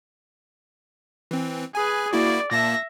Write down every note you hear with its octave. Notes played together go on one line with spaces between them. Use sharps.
E3 C4
G#4 B4 G#5
A#3 E4 F#4 D5
A#2 A#3 E5 A5 A#6